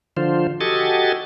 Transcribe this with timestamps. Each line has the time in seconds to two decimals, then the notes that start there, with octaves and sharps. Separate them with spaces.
0.17 D3 F3 F4 C5
0.61 F#4 G4 A4 D#5 G#5 A6